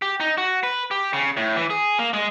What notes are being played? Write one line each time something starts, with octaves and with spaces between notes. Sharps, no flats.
G4
D#4
F#4
B4
G4
C#3
A2
E3
G#4
A#3
G#3